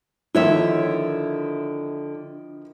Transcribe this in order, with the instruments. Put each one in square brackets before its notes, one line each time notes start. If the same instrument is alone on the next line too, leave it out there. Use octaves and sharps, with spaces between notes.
[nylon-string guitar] D3 C#5 E5 [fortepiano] D#3 F3 E4